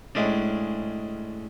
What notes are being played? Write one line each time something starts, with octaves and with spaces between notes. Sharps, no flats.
A2 G#3 C#4 D4